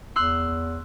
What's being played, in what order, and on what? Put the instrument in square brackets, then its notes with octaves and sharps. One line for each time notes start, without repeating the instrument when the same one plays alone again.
[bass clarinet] E2 [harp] C6 E6 F#6